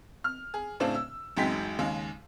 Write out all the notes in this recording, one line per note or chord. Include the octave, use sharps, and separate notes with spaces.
F6
G#4
A2 C#3 C4 D4
E6
A1 F#2 G#3 D#4 G5 B6
D#2 C#3 G#3